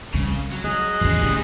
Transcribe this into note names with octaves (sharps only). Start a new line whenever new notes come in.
C2 C#3 C4
F#3
C4 G#4 D#5 F#6
E2 C#3 E3 G#3
C2 A2 C#3 G3